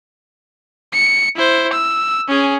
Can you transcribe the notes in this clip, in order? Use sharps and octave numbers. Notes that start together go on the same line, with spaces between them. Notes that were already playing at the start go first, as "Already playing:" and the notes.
C#7
E4 C5
E6
C#4 G#4